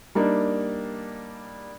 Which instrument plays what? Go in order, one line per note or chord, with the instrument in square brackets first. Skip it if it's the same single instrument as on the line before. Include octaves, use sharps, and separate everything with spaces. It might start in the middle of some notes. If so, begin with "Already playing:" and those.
[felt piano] G3 A#3 D4 D#4